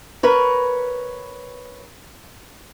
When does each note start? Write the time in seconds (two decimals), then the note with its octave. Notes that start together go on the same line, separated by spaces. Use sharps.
0.23 A#4 B4 C#5